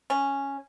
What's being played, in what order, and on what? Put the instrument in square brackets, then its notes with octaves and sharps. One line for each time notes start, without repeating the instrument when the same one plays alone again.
[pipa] C#4